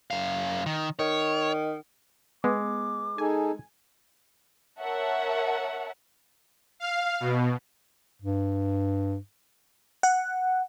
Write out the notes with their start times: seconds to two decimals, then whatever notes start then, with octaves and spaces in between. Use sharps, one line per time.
0.11 F#2 F5
0.66 D#3
0.99 D#3 C#5
2.44 G#3 B3 D6
3.18 D#4 G#4 A4 G#5
4.81 A#4 C#5 E5 F#5 A5
6.80 F5
7.20 B2
8.22 G2
10.03 F#5